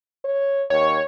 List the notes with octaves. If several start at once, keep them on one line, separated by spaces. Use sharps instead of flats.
C#5
D#2 C#5